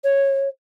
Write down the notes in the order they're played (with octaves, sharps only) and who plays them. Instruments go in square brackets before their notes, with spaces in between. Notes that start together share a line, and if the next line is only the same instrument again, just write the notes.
[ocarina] C#5